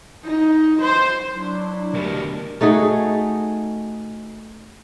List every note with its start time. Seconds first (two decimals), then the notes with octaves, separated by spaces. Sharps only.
0.24 D#4
0.81 C5
1.35 F#3 D4 E4
1.94 D2 B2 G#3 G4 A#4
2.61 A3 D#4 F#4 G#4